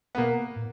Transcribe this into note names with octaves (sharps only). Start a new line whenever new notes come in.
B3
B2 A#3
A2